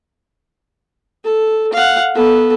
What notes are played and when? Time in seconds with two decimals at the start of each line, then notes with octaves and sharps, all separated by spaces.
1.25 A4
1.74 F5 F#5
2.15 B3 A4